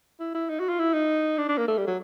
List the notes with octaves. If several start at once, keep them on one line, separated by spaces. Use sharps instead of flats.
E4
E4
D#4
F#4
F4
E4
D#4
D4
D4
A#3
A3
G3
F#3